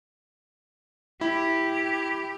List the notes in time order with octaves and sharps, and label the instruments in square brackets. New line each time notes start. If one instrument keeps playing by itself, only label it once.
[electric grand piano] E4 [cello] G4